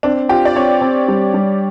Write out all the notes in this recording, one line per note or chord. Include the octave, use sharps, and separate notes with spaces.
C4 D4
F4 G4
D5
C4 C#5
C4
G3
G3